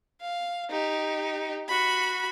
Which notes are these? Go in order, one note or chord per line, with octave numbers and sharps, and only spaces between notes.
F5
D#4 G4
F#4 B5